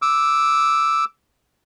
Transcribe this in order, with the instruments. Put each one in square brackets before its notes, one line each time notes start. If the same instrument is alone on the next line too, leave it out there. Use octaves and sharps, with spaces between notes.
[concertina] D6 E6